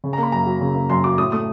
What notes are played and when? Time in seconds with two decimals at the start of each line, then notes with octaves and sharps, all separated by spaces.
0.04 C#3
0.13 A#5
0.18 A#3 B5
0.32 F#2 A#5
0.46 F#3
0.61 C#3
0.75 A#3
0.90 F#2 C6
1.04 F#3 D6
1.18 A2 D#6
1.32 A3 D#6